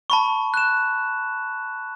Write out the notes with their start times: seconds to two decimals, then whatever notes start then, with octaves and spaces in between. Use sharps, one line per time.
0.10 A5 B5 C#6
0.54 F#6 E7